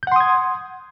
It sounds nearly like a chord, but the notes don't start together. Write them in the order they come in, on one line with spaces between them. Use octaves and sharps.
G6 F#5 C6 D#6 G#6